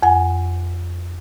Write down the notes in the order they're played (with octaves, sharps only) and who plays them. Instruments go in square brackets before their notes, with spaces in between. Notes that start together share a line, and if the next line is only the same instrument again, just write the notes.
[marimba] F2 F#5 G#5